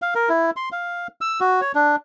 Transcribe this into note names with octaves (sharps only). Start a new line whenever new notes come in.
F5
A#4
E4
C6
F5
E6
F#4
C#5
D4